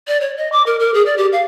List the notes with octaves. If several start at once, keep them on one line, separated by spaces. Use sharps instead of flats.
D5
C#5
D#5
D6
A#4
A#4
G#4
D5
G4
F5